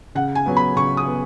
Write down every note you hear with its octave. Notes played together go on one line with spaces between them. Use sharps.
C#3 F#5
G#5
F#3 B3
B5
C#3 C#6
D#6
B3